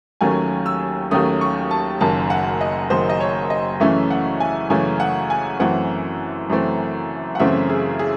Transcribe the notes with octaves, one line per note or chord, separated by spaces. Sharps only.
D#2 D#3 F#3 A3 C#4 G#5
E6
D#2 D#3 F#3 A3 C#4 D#6
C#6
A5
F#1 F#2 D#3 A5
F#5
D#5
F#1 F#2 D#3 C5
D#5
C#5
D#5
F#2 C#3 E3 A3 C#4 E5
F#5
G#5
F#2 C#3 E3 A3 C#4 G#5
F#5
G#5
F#2 E3 A3 C4 F#5
F#2 E3 A3 C4
F#5
F#2 C#3 E3 A3 C4 E5
G#4
G#4